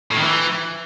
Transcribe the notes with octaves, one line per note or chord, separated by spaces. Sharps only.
A2
D#3
E3